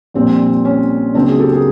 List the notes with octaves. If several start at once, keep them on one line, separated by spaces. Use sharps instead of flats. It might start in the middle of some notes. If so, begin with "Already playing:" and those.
A#1 A#2 G3 C4
C#4
C#2 C#3 F#3 A#3 C4 D4
F#4 G#4
G4 A4
G#4 A#4